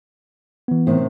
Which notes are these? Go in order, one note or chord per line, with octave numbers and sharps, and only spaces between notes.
E3 B3
A2 C3 D#3